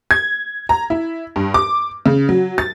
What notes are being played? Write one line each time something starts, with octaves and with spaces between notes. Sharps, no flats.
G#6
A#5
E4
G2
D6
C#3
F#3
A6